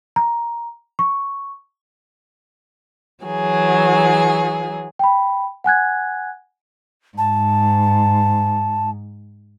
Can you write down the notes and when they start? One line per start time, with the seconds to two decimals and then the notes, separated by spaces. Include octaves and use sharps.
0.16 A#5
0.99 C#6
3.24 E3 F#3 G#4
4.99 G5 B5
5.64 F#5 G#5 F#6 G#6
7.18 G#2 A5